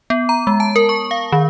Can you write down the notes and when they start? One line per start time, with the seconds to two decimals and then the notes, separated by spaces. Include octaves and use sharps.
0.10 B3
0.29 A#5
0.47 G#3
0.60 A5
0.76 A#4
0.89 C#6
1.11 F5
1.32 D#3